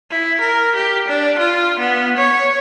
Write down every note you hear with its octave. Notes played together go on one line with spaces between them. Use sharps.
E4
A#4
G4
D4
F4
B3
C#5